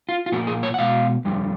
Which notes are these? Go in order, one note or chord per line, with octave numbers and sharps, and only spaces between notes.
F4
F4
A#2 F3 A#3 F#4
G#4
C#5
F#5
B2 G#3 F5
F2 D3 G3